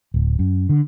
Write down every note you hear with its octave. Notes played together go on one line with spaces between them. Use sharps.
D1
F#2
D3